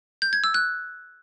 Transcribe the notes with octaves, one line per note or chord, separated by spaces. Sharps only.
G6
G#6
E6
F#6